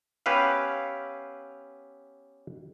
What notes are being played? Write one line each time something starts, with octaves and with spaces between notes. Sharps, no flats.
B3 C#4 G4 B4 E5 F5